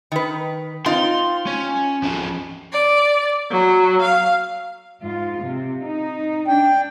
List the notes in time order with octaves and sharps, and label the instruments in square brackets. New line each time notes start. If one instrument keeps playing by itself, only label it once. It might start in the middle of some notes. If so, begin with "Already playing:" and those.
[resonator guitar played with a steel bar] D#3 B4
[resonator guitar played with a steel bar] C4 D#4 F4 [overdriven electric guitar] C6
[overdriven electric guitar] C#4
F3 C#4
[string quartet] D5
F#3
F5
[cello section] G#2 F4
C3
D#4
[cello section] D4 [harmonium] G5